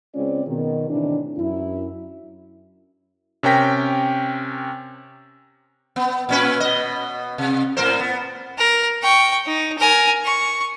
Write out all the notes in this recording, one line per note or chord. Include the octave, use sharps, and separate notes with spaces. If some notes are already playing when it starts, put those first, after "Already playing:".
C#3 G#3 C4 C#4 F4 D5
B2 D#3
A2 C3 D#3 E3 D4
F#2 E4
C3 C#4 A#4 G5 A#6 B6
B3
A#2 C#4 B4
B2 D#5
C3
A2 A#4 C5
B3
A#4
G5 C#6
D#4
A#4 G#5
C#6